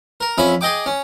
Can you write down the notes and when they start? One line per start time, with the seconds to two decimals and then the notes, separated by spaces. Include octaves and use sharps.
0.21 A#4
0.38 F2 C#4 E5 B5
0.61 G#4 D#5 G5 D6
0.86 C#4